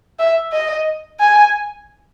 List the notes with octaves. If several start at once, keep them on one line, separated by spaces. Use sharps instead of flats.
E5
D#5
G#5